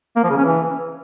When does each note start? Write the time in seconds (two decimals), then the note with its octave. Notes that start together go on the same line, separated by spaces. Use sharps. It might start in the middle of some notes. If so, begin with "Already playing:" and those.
0.16 A#3
0.23 F3
0.30 C#3
0.38 C#4
0.45 E3